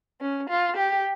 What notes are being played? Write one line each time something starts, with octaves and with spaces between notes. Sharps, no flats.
C#4
F4
G4